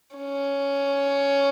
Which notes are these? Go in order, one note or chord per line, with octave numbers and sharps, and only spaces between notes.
C#4